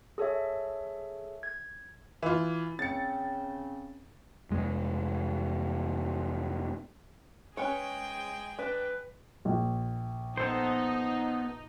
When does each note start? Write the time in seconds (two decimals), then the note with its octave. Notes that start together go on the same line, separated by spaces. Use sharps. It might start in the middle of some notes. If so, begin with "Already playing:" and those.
0.18 G#4 A4 C#5 E5
1.43 G#6
2.23 E3 F4
2.79 C#3 C4 A6 C#7
4.50 F1 G#3
7.57 G#3 C#4 G#4 B4 C#5 G5
8.59 D4 B4
9.45 A#1
10.37 B3 D#4 A4 C5